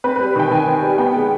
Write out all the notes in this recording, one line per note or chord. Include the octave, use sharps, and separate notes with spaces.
C4 B4
B4
G3
D#3 G5
D#3 G#5
C4
G3
B3 G5
G#3